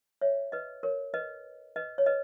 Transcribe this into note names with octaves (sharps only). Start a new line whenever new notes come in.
C#5 E5
B4 D#5
A#4 C#5
B4 D#5
B4 D#5
C#5
B4 D#5